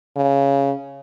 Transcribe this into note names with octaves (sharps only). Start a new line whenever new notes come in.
C#3